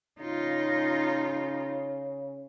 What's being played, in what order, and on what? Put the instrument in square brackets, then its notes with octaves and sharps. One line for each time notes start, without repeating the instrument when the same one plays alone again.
[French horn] C#3 [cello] D#4 F4